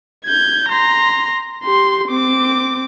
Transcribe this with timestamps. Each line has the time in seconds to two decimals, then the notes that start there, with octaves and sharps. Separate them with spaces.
0.24 G6 G#6
0.69 A#5 C6
1.65 G4 C6
2.08 C4 D6